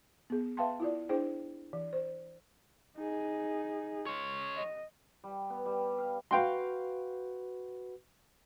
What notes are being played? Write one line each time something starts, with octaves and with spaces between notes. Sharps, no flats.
B3 G#4
B4 E5 F5 G5 A5 C6
E4 F4 D5
D4 E4 G#4 C5 G5
E3
C5
D#4 G#4
G#3 C#5
D#5
G3
B3
G3
F5
F#4 B4 F5 G5 C6